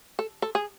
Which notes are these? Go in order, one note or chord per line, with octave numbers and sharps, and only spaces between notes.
A4
A4
G#4